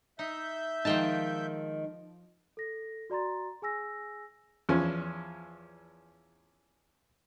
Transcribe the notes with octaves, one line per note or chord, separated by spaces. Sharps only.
D#4 E5 G6
D#3 F3 G#3 D#4 G5 A5
A4 A#6
F#4 D5 A#5 C6 A6
G#4 G#5 E6 A#6
E2 F3 C#4